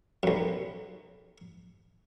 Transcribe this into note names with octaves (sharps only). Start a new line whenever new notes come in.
B1 F#2